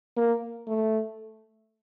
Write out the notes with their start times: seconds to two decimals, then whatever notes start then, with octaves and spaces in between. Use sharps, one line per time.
0.17 A#3
0.67 A3